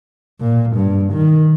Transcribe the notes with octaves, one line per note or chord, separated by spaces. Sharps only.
A#2
G2
D#3